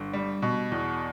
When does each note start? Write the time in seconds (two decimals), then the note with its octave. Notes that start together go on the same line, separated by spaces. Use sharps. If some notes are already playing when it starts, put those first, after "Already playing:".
Already playing: G1
0.13 G3
0.42 B2
0.72 E2